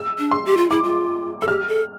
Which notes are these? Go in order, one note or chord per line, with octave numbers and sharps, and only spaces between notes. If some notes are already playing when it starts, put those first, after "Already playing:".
Already playing: E6
D4
C6
G4
F4
E4 D6
F4
A4 E6
G4 F6
A4